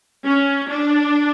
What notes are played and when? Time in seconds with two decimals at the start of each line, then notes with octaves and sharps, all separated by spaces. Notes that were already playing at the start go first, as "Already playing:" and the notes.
0.24 C#4
0.69 D4